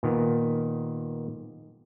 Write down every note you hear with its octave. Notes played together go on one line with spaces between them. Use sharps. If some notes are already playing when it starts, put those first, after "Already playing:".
A#2 D#3 B3